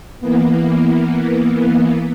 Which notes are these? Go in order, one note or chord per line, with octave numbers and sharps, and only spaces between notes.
E3 A#3 B3